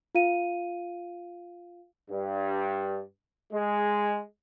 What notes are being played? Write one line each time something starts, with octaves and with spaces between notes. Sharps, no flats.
F4 F5 D#7
G2
G#3